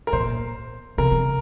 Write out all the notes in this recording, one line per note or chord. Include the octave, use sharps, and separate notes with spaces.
A#4
A#2 C5
C3 A#4
C3